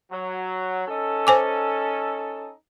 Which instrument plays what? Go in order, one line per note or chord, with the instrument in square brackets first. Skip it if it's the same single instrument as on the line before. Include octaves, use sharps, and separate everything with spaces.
[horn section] F#3
C#4 D#4 A4
[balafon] C5 G#5 D6